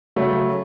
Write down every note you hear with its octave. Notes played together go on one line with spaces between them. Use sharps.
C#3 F#3 A3